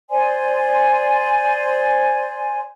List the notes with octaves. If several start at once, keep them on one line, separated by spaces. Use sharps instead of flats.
C5 D5 G#5 C6